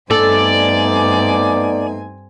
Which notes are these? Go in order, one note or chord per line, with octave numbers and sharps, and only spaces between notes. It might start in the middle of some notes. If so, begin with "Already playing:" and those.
G2 A3 B3 C4 D#4 A4 D5 G#5